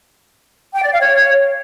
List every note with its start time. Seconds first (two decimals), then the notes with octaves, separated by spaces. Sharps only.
0.74 G5
0.83 D5
0.92 F5
1.01 C#5